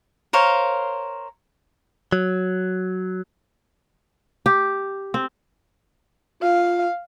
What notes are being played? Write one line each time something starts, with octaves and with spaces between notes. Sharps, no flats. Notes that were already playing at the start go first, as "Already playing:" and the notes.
A#4 C5 C#5 F5
F#3
G4
C4
F4 F5